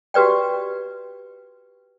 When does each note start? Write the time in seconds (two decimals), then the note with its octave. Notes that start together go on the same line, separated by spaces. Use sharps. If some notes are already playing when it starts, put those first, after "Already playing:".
0.14 F#4 G4 B4 D5 G5